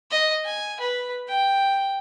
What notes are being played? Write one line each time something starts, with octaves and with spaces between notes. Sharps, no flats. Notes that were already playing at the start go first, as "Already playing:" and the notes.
D#5
G#5
B4
G5